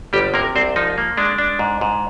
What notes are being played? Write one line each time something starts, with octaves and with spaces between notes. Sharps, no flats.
G1 G3 G4
C3 A#3 A#4
C2 C4 C5
F3 D#4
A#3
G#3 D4
D4
G#2
G#2